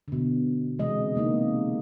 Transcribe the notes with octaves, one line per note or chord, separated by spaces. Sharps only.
B2 D3
C3 E3 G#3 D#5
C3 A#3 D#4